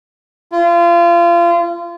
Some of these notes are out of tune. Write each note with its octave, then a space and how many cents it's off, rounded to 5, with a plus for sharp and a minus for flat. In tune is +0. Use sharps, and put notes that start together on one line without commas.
F4 -30